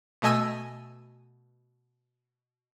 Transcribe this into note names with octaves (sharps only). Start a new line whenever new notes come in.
B2 A3 D#5 G#5 E6 D#7